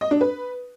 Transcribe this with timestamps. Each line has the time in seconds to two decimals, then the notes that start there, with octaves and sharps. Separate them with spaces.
0.01 D#5
0.11 D4
0.21 B4